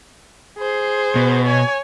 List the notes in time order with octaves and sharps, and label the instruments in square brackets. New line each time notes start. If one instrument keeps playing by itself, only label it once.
[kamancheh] G#4 C5
[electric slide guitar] B2
[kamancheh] C#5 G#5